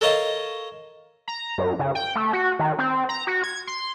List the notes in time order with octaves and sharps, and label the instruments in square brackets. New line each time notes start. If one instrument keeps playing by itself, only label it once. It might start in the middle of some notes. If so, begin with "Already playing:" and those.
[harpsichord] A4 A#4 C#5 D#5 F5 A5
[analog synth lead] A#5
F#2
C#3
G5
A3
F#4
D#3
C4
A#5
F#4
G#6
C6